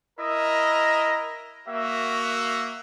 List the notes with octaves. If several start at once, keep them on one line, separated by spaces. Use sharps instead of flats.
E4 A#4 D#5
A#3 F#4 E5